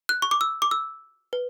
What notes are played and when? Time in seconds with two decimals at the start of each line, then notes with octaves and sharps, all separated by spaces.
0.09 F#6
0.22 C#6
0.31 D6
0.41 E6
0.62 D6
0.71 E6
1.33 B4